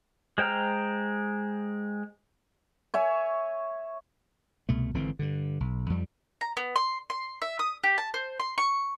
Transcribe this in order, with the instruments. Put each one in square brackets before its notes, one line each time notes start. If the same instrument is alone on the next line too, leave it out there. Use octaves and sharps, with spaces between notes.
[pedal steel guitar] G#3 C5 G5 A#5 F6
[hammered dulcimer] C#5 E5 G#5
[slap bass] C2 B2 A3
G#1 D3 E3 C4
G2 D3
B1
F2 F3 G3
[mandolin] A#5
B3
C6
C6
E5
D#6
G4
A5
C5
C6
C#6